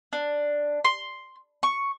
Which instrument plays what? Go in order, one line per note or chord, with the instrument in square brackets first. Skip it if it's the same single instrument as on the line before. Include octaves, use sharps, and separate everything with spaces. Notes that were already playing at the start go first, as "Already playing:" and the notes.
[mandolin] D4
C6
C#6